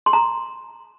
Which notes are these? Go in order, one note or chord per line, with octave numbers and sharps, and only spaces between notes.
C6
A#5